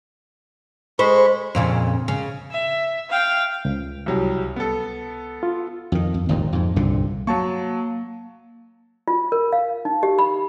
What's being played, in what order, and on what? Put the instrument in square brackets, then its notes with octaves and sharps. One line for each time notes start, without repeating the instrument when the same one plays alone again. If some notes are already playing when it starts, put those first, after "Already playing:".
[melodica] G#3 B5 C#6 [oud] C5
[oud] F2 A#2 C#3
C#3
[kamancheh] E5
F5 G5
[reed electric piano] C#2
[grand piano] C2 F#3 G3
B3 A4
[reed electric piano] F4
[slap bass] F2 D#3
F2
G#1 D#2 A#2
F2 G#2
C2 G2 A#2 D3
[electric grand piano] F#3 A5 C#6 [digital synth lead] A#3
[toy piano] F4
A#4
F5
D#4
G4
B5